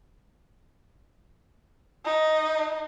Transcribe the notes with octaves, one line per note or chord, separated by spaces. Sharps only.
D#4